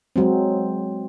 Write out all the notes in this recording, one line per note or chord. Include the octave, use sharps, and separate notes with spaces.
F#3 G#3 C4